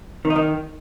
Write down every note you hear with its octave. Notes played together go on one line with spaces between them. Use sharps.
D#3
D#4
D#3